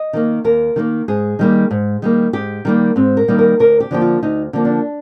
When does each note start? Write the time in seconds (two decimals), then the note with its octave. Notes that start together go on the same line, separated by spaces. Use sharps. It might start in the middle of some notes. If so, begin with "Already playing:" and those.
Already playing: D#5
0.13 D#3 G3 A#3
0.44 D#2 A#4
0.76 D#3 G3 A#3
1.08 G#2 G#4
1.39 D#3 G3 A#3
1.71 G#2
2.02 D#3 G3 A#3
2.33 G#2 G4
2.65 D#3 G3 A#3
2.96 G#2 C4
3.17 A#4
3.28 D#3 G3 A#3
3.39 A#4
3.59 D2 A#4
3.80 G4
3.91 D3 F3 A#3 G4
4.02 F4
4.23 D2 D#4
4.53 D3 F3 A#3
4.65 D4